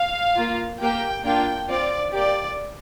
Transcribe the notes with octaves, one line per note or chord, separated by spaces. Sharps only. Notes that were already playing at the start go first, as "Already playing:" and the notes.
Already playing: F5
A#3 F4
A#3 G4 G5
A#3 D4 F4 G5
C4 F4 D5
A#3 G4 D5